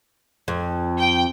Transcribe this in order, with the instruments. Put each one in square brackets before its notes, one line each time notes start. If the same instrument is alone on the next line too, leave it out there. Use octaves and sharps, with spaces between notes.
[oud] F2
[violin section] G5